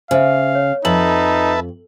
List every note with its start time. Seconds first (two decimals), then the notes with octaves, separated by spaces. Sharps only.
0.11 C#3 C5 E5 F5
0.55 C#5
0.85 F2 D#4 B4 E5 A5 F#7